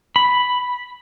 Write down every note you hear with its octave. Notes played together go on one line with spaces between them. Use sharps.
B5